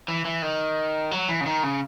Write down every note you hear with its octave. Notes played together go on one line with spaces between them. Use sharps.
E3
E3
D#3
F#3
E3
C#3
D#3
C#3